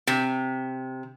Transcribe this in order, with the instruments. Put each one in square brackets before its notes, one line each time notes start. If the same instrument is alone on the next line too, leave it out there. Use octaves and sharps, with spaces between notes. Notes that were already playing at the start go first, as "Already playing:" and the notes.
[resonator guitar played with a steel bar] C3